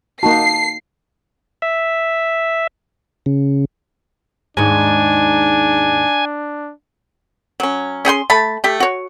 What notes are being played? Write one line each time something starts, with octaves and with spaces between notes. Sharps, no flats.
A#3 D#4 F#4 A5 C7
E5
C#3
D#2 G#2 D4 G#5
F#3 C#4
C#4 G#4 G5 C6
A3 A5 B5
A3 G4
F#4 C#5